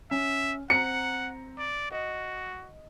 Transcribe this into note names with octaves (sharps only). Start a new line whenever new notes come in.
C#4 E5
C4 F#5 A#5 C#7
D5
F#4 D#5